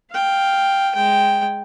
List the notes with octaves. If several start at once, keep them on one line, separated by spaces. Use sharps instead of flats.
F5 G5
G#3 G5